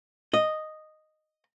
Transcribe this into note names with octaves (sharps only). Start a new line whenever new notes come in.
D#5